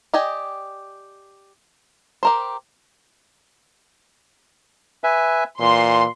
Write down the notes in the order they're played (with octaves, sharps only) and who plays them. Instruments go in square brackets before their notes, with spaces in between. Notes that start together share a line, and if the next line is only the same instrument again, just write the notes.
[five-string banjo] G4 D5 D#5 G5 G#5
G4 A#4 C5
[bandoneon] B4 E5 G#5
[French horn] A#2 [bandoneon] E3 [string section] C6